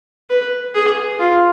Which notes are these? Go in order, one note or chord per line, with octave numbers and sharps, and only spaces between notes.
B4
G#4
F4